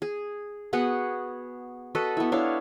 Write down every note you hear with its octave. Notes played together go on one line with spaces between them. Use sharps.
G#4
B3 F#4 G#4 F#5
F#4 A4 B4 D#5
B3 E4
D4 E4 C#5 F5